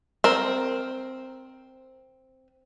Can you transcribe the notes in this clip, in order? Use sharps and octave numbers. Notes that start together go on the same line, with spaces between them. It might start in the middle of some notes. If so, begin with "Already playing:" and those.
C4 A#4